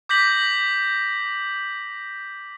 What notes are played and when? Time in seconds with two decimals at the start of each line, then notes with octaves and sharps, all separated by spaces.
0.09 D6 G6 A#6 B6 F#7